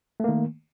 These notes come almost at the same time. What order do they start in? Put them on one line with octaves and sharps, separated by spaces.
A3 A#3 D#3